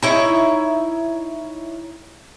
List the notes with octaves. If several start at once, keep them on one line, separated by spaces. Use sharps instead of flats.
D#4 E4 C#5